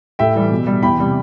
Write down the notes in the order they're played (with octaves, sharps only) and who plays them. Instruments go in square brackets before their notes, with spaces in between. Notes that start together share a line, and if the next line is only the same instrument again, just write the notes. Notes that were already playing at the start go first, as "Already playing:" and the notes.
[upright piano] A2 E5 G5
E3 G3
B2
G3
E2 G5 B5
C3 G3